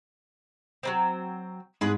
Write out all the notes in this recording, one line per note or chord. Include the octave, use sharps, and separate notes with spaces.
F#3 A#3 C4
G#2 G#3 G#4 B4